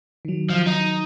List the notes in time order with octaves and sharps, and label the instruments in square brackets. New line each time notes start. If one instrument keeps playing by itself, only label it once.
[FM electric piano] D#3 F#3
[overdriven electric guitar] F3
D#4